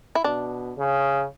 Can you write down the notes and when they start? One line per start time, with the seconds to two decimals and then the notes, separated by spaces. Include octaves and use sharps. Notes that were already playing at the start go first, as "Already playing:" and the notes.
0.15 E4
0.24 B2 D4
0.78 C#3